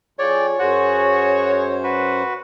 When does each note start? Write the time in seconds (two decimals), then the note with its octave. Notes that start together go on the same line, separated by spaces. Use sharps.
0.19 F2 F4 G#4 C#5 D5 G5
0.59 F#2 F#4 G#4 C5 F#5
1.84 F#4 B4